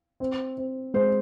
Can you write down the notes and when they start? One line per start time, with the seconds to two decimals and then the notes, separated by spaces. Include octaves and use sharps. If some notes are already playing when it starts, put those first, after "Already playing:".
0.20 C4
0.58 C4
0.94 G#3 C5